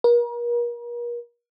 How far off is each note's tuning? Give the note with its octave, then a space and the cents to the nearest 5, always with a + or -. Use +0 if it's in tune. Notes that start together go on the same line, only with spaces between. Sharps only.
A#4 +40